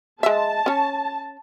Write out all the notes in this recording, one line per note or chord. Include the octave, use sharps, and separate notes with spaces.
G#3 E5 A5
C#4 C#5